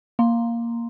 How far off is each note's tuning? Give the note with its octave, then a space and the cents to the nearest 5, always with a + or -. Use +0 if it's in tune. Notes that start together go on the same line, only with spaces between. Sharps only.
A#3 +0 C6 +0